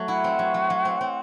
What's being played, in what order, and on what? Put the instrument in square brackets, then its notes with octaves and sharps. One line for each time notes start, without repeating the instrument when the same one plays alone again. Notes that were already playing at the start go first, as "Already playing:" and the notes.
Already playing: [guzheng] F#3 A3
[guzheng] E4 [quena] F#5
[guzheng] C4
F#3
F#3
F#3
C4
C4